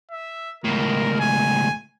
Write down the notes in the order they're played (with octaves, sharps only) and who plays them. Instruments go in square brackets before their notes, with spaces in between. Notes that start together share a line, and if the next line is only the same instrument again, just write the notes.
[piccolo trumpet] E5
[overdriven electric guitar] C#2 A2 [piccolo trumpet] A#4
[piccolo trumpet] G#5